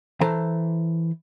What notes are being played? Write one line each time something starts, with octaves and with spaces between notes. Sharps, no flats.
E3 A4 C5 A5 A#5